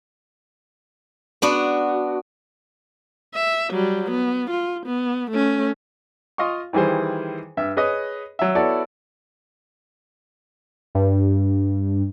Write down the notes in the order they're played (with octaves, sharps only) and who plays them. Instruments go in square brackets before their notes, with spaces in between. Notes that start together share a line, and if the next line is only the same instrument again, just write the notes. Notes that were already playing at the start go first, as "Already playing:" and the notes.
[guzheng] B3 D4 F#4
[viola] E5
F#3 G3
B3
F4
B3
A3 C#4
[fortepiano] F4 D#5 F5 C6 C#6
D#3 E3 G3 G#4 C5
G2 E5
G#4 B4 C#5 D#5
F#3 E5
B3 E4 F#4 A4 C#5 D5
[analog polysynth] G2